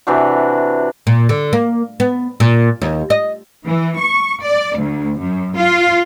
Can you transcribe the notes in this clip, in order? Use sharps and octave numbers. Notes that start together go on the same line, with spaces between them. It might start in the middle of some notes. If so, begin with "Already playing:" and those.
C3 E3 D4 F#4
A#2
D3
A#3
B3
A#2
D#2
D#5
E3
C#6
D5
D2
F#2
F4